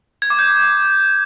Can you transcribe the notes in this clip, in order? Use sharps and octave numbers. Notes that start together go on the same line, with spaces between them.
G#6
D6
G6